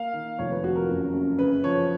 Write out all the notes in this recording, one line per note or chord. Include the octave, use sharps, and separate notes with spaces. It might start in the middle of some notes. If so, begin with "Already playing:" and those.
Already playing: A#3 F5
D#3
F1 C#5
B4
F2 F#4
A#4
F#1
F#2
C#3 B4
F3 C#5